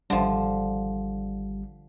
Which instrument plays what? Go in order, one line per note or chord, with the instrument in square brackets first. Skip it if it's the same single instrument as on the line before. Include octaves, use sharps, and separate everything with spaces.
[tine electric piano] G#1 G3 [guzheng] D3 F3